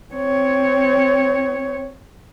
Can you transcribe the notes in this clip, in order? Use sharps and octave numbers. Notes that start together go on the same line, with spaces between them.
C4 C#5